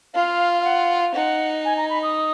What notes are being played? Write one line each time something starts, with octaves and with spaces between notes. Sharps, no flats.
F4 F5
F5
F#5
D#4 F#5
G#5
A#5
B5
D#6